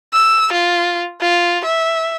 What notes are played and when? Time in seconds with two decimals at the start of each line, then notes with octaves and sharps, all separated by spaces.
0.13 E6
0.53 F4
1.21 F4
1.65 E5